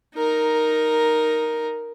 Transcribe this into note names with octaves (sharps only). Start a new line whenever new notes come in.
D#4 A#4